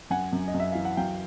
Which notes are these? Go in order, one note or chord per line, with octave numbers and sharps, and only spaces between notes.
F#2 F#5 G#5
F#2
D#5
F#2
E5
E3 F5
F#5
F#3 F5 G5